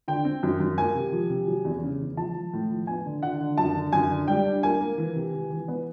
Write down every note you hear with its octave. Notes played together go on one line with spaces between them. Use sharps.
D3 G5
C4
F#2
F#2
A#3 G#5
C3
F3
C3
F#3
E2
C#3
E2
F3 A5
F3
A2
F3
B3 G#5
D3
D3 F#5
D3
F#2 A5
D3
F#2 G#5
D3
G3 G5
D4
A#3 G#5
A#3
E3
C3
E3
E3
B3